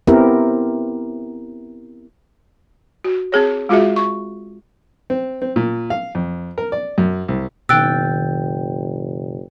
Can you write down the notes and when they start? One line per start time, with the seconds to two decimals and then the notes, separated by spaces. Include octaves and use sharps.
0.07 B3 C4 E4 G4 A#4
3.04 F#4
3.32 C4 G#4 C#5
3.69 G#3 F4 F#4 G#4 E5
3.96 C#6
5.10 C4
5.42 C4
5.56 A#2
5.90 F5
6.15 F2
6.58 A#4
6.72 D5
6.98 F#2
7.28 C2
7.69 F#1 B2 D#3 G5 E6 F#6 A6 D7